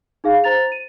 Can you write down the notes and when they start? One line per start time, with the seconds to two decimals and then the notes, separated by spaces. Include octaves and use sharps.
0.24 D#4 G#4 F5
0.44 C5 A#5 A6 F7
0.72 D#7